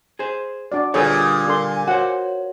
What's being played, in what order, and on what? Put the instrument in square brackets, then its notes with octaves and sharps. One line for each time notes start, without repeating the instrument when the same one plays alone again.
[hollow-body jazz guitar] G#4 C5
[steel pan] D4 F#4 D5
[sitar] A#2 [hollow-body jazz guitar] D3 G3 B4 [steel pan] G#4 A4 C#5 [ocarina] D#6
[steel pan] D4 A4 C6 [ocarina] A#4
[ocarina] G#5
[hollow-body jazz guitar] F#4 C5 [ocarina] C#5 [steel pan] F#5